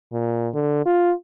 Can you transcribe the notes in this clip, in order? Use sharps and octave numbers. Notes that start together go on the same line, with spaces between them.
A#2
D3
F4